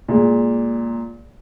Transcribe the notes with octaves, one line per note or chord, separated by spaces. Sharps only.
A#2 G#3